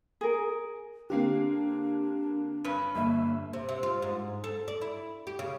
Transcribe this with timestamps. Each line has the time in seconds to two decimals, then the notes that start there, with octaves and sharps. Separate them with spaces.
0.21 G#4 A#4
1.10 D3 A#3 C4 D4 G4 C7
2.64 G2 C#4 B4
2.95 G1 A#3 E5
3.53 C3
3.69 C3
3.83 F4
4.02 G#2
4.44 A4
4.68 D5
4.81 E4
5.27 G4
5.39 C#3